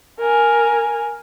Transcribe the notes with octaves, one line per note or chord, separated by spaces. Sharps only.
A#4 G#5